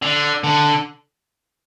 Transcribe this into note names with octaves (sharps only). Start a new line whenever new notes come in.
D3
D3